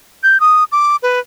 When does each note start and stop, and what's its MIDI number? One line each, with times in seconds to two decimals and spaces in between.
0.23 0.40 91
0.40 0.64 87
0.72 0.96 86
1.03 1.20 71